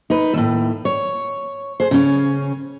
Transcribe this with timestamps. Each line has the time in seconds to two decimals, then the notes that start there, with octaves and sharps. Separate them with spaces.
0.10 D#4 B4
0.33 D#2 A2
0.85 C#5
1.80 G#4 C5
1.91 C#3 C#4